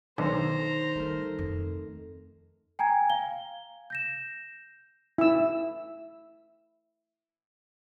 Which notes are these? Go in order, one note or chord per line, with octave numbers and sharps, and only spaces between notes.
B1 D3 D#3 C5 A#5
G3 A3 A#4
F2
G5 G#5 A#5 G#6
F5 G7
G6 A#6 E7
E4 E6